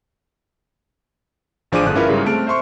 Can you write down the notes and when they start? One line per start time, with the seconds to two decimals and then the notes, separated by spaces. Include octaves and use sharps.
1.72 A1 F3 D4 G#4 D6 D#7
1.84 G1 D3 F#6
1.95 C#4 E4 F4 A#4 B4 C#5
2.09 G#2 C#3 G3
2.26 A3 C4 A5 F6 D7
2.47 C5 E5 C6 C#6